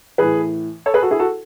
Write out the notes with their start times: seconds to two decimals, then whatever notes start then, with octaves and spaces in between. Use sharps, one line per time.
0.18 A2 E3 G#4 B4
0.86 A4 C#5
0.94 G#4 B4
1.03 F#4 A4
1.11 E4 G#4
1.19 F#4 A4